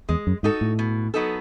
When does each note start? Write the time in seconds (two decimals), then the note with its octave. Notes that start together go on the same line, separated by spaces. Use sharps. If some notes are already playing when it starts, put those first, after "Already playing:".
0.09 E2 G#3
0.27 F#2
0.43 G#2 D#4 F#4 A4
0.61 A2
0.79 B2
1.14 F#3 B3 D#4 A4